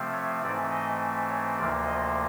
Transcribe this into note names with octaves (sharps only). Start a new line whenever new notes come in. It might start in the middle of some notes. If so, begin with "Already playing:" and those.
Already playing: C3 F3 A3 C4
C#5
G#2 E3 A3 C4 D5
D#5
C#5
D2 C3 F3 A#3 D5
D#5